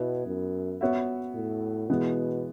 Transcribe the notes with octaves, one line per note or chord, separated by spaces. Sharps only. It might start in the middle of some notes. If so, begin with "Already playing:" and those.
Already playing: B2 B3 E4
F#2
B3 F#4 C#5 E5
A2
B2 E3 G#3 B3